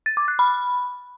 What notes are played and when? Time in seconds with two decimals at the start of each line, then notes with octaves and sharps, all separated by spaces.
0.06 A6
0.17 D6
0.28 F#6
0.39 B5